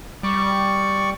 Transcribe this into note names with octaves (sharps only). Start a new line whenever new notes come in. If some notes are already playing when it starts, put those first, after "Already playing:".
G3 D5 C#6